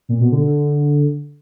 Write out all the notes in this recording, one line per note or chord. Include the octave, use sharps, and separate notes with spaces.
A#2
B2
D3
D3